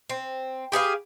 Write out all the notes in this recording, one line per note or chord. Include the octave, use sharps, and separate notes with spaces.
C4
G4 G#4 B4 F5